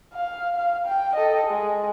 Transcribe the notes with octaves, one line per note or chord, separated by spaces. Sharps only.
F5
F5
G5
A4 D#5
G#3